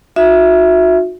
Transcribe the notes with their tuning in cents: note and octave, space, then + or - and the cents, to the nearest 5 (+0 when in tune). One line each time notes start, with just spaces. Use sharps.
D#4 +0 F#4 -40 E5 +0